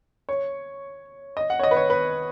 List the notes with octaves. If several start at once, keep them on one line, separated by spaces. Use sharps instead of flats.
C#5
D#5
F#5
C#5
D#5
B4
C#5
B4